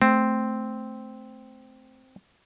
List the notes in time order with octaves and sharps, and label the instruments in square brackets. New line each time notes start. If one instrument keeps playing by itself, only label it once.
[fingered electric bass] A3 [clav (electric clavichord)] C4